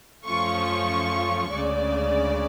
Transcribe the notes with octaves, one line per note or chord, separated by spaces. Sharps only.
F#2 F3 A3 C#4 F4 C#6
D2 C#3 G#3 D5